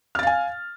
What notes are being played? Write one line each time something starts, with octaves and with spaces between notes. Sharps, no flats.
F5 G#5 F6 A6